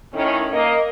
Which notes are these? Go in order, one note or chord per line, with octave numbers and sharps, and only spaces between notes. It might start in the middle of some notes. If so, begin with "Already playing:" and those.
A2 D#3 C#4
A#3 D#5